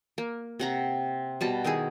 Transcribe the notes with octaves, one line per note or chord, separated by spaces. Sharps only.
A#3
C3 F#5 A#5
B2 G3 A5
D#3 D#4 E4 G#4